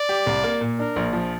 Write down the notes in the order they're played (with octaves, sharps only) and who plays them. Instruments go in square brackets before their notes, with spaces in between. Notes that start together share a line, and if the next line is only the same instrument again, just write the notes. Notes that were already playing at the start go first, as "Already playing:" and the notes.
Already playing: [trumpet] D5
[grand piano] G4
C2
A#3
A#2
[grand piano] D4 [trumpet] A#4
[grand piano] A#1
F3